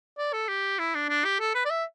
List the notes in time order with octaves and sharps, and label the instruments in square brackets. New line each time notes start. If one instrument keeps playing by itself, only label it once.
[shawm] D5
A4
G4
E4
D4
D4
G4
A4
B4
D5
E5